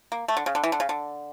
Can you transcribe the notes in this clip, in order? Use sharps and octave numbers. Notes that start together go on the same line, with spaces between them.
A#3
A3
D3
C#3
D3
E3
D3
C#3
D3